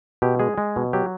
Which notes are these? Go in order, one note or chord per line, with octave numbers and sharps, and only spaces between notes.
B2 G4
G#3 G#4
G#3
B2
F#3 G4